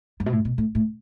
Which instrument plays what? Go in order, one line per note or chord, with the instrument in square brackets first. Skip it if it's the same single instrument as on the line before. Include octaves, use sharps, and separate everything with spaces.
[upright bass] G2
B2
A2
B2
A2
A2